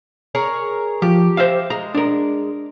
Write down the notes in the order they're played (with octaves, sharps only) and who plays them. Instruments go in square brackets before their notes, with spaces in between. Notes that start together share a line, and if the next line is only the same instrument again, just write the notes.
[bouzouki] G#4 A#4 C#5
[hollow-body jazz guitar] F3 [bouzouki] G4
[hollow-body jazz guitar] C5 E5 F5
[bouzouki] G#3 [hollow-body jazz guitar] A#5
[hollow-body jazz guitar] D4 A#4